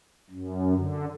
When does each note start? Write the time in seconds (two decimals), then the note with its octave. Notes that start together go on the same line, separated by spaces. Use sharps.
0.30 F#2
0.75 D3